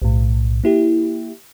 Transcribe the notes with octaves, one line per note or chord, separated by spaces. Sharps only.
B1 A2
A#3 E4 G4